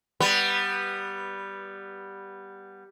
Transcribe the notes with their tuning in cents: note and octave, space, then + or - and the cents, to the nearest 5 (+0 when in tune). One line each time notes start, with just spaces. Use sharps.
G3 +0 B3 -10 B4 +0